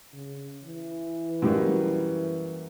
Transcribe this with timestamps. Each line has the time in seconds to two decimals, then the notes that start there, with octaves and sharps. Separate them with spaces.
0.13 C#3
0.65 E3
1.42 F#2 G3 A#3